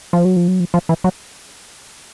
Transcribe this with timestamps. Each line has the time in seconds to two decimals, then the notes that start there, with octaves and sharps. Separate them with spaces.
0.13 F3
0.25 F#3
0.36 F3
0.48 F#3
0.60 F3
0.74 F3
0.89 E3
1.04 F#3